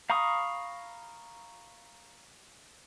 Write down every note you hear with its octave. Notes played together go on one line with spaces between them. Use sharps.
F5 A#5 B5 C#6 D#6